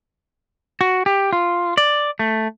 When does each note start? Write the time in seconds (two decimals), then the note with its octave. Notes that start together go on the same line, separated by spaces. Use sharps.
0.81 F#4
1.06 G4
1.33 F4
1.78 D5
2.19 A3